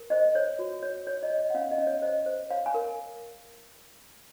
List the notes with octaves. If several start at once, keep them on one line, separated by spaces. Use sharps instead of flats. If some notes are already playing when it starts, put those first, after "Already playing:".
Already playing: A#4
C5 D#5
C5 C#5
F#4
C#5
C#5
D#5
C#5
D#5
F#5
C#4 F5
D#5
C#4
C#5
C5 D#5
C5
C#5 F5
G#5
A#4